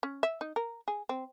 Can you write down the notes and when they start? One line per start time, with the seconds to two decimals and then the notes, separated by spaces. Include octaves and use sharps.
0.03 C#4
0.23 E5
0.41 D#4
0.56 A#4
0.88 G#4
1.09 C4